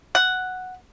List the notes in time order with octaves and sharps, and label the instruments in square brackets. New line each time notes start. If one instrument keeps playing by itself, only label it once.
[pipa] F#5